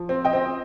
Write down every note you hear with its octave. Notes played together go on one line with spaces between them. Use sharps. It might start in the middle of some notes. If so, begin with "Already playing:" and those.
Already playing: F3
C4
D#5 G5
C4